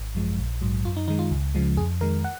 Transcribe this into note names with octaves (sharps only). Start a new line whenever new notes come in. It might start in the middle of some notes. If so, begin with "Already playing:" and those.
Already playing: G#1
F#2 F3 G#3
A#1
G#2 F#3
F#2 F4
D#4
D#3 G#3 D#4
F4
C#2
C#3 F3 G#3
F2 G#4
D#3 G#3 A#4
F#5